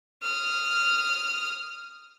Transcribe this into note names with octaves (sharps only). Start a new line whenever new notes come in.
D#6 F6